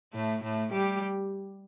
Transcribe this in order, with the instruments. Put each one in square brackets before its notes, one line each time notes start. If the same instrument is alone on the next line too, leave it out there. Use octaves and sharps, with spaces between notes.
[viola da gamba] A2 A3
A2 A3
G3 G4